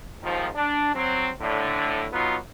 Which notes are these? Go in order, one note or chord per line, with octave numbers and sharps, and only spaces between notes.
D#2 G#2 D#3 F3
D4
F#3 C4
A2 D3
F#3 B3 D#4 F4 F#4